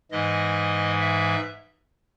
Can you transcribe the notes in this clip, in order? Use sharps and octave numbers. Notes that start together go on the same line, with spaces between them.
G#2 E3 G#3 D#5
E5